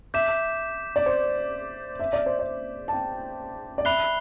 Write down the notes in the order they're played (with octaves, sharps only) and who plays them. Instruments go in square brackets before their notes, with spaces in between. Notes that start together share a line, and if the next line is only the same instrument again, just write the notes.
[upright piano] E5 [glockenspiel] D6 G6 B6 E7
[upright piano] D5
C5
E5
D5
C5
D5
A5
G5
D5
[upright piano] E5 [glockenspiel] B5 F#6 C7 G7